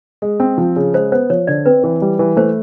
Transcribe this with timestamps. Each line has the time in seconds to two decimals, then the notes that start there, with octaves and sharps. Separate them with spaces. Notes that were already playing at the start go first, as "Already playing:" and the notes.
0.22 G#3
0.40 C4
0.58 F3
0.76 C#3
0.94 G#3 C5
1.12 B3 C5
1.30 F3 C#5
1.47 D3 D5
1.66 C4 B4
1.84 E3
2.02 G3
2.19 E3
2.37 A3 C5